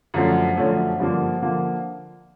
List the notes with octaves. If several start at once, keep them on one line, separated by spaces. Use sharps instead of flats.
F#2 D3 F3 A3 C#4
F#2 D3 F3 A3 C#4
G2 D3 F3 A#3
D3 F3 A#3